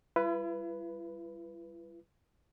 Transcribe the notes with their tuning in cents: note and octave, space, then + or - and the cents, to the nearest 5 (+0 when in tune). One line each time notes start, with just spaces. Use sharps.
G3 +0 E4 +45 B4 +0